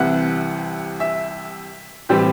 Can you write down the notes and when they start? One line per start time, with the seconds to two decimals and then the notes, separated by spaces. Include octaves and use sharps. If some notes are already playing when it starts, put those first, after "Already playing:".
Already playing: C2 C3 E3 F#5
1.00 E5
2.09 A2 E3 G3 C4 G4